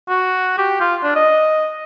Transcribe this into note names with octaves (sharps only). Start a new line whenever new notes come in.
F#4
G4
F4
D4
D#5